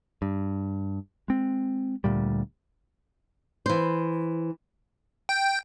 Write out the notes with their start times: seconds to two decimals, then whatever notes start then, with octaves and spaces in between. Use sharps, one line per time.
0.22 G2
1.28 G#3 C4
2.04 D2 A#2 G3
3.66 E3 C5
5.29 G5